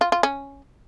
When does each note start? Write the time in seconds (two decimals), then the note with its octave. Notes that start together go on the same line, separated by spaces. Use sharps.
0.01 F4
0.12 F4
0.23 C#4